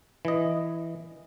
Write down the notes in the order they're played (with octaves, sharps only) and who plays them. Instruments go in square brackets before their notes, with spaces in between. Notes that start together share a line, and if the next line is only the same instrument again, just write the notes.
[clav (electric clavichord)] E3 D#5